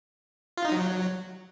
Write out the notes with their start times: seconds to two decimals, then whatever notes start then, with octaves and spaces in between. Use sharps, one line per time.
0.57 F4
0.65 D#4
0.72 F#3